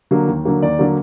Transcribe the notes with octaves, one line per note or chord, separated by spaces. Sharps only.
D3 F#3 A#3
D#2
D3 F#3 A#3
D#2 D5
D3 F#3 A#3